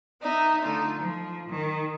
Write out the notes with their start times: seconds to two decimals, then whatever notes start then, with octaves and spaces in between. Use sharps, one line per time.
0.21 B3 D#4 D#5 E5
0.61 D3 A3 D#4 F4
0.98 F3
1.48 D#3